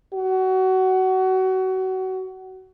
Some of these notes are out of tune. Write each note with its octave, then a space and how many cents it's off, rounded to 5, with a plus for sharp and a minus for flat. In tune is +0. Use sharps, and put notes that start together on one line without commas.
F#4 +25